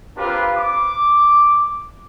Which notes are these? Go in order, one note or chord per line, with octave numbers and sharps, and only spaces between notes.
C4 D4 F4 G4 A#4 B4
D6